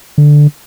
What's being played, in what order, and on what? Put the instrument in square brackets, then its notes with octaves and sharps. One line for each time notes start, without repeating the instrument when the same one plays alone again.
[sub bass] D3